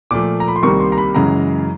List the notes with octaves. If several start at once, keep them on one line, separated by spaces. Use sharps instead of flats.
A#2 F3 A3 D6
A#5
B5
C6
C2 C3 D#3 G3 A#3 C#6
C6
A#5
B5
F#2 C#3 E3 G#3 A#5